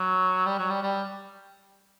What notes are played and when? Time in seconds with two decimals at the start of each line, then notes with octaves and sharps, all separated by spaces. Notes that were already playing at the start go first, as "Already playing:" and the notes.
Already playing: F#3
0.46 G3
0.58 F#3
0.70 G3
0.83 G3